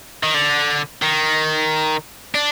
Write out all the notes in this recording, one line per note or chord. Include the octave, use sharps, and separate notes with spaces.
D#3
D3
D#3
D4